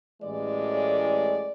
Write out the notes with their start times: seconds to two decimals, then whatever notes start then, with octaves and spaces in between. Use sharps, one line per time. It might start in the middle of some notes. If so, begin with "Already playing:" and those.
0.21 A1 A2 E3 G#3 D5